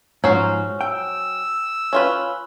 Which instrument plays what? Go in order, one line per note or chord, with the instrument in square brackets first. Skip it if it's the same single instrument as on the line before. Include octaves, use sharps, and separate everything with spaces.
[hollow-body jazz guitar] G#2 F3 [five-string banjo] F#3 C#4 C5
[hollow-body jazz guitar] G5 [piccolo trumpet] E6
[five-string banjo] C#4 F4 B4